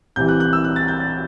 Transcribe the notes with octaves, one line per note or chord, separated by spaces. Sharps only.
C2 C3 E3 G6
F#6
F#6
E6
F#6
A6
G6
A6